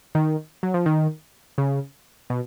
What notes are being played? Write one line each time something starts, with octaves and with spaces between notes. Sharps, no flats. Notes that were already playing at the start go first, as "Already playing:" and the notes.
D#3
F#3
F3
D#3
C#3
B2